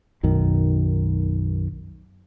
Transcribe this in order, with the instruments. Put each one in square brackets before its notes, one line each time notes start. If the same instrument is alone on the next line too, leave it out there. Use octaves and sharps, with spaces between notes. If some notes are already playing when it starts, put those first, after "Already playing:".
[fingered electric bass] B1 F#2 D#3